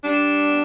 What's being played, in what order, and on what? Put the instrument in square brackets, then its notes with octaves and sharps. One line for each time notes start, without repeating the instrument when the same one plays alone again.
[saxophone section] G3 D4
B3